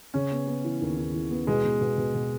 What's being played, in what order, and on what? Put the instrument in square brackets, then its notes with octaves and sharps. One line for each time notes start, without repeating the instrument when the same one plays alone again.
[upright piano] C#3 [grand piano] C#4
[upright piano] B3
B3
E3
D#2
D#2
E3
B3
[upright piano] B2 [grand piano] G#3
[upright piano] B2
B2
B2
B2